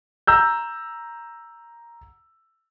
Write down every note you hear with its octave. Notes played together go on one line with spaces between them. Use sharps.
A#5 E6 G6